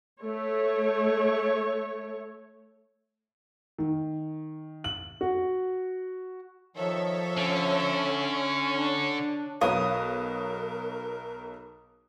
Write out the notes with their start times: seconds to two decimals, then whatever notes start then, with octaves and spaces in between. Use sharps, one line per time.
0.20 A3 C#5
3.78 D#3
4.84 F#7
5.21 F#4
6.76 D#3 F3 A4 C#5 E5
7.37 D3 C#4
8.77 D4 C#5
9.61 B1 A#4 B4 C#5 F5 D#6